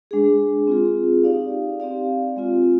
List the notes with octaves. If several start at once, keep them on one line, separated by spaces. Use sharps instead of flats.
G#3 D4 G#4
C4 F4 G#4
D#4 G4 D5 F5
C4 G4 D5 F5
G#3 C4 F4